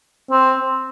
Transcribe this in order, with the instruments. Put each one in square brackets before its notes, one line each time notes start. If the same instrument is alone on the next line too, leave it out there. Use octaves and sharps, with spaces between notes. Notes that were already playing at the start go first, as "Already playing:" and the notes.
[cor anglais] C4